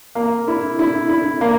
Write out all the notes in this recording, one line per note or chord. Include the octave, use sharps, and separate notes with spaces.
A#3
E4
E4
E4
A#3